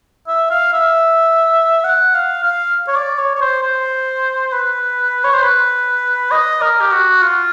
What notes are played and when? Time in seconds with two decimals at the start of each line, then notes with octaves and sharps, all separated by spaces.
0.28 E5
0.50 F5
0.73 E5
1.84 F#5
2.15 F5
2.44 F5
2.88 C#5
2.96 D5
3.18 C#5
3.35 C#5
3.41 C5
3.63 C5
4.53 B4
5.24 C#5
5.33 C5
5.43 B4
6.32 D#5
6.62 A#4
6.80 G4
6.92 F#4
7.22 F4